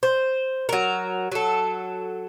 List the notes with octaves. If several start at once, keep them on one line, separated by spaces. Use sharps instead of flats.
C5
F#3 A#4
F#3 A4